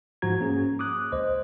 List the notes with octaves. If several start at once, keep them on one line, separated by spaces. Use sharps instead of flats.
G#2 F3 F#4 A#5 G#6
A#3 C#4 G#4
D6 D#6 F#6
C#2 C5 D#5